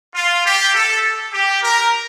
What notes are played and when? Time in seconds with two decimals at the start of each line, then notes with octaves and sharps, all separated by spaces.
0.14 F4
0.44 G4
0.73 A4
1.33 G4
1.62 A#4